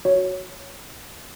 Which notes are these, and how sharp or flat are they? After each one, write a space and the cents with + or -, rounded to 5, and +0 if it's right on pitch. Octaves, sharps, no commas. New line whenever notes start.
F#4 -5 C#5 +0